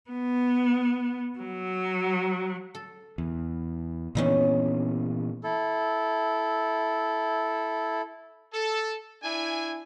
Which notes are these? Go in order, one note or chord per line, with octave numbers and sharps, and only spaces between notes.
B3
F#3
A4
E2
G2 A#2 D#3 E3 B3 C#4
E4 A4
A4
D4 E4 G#5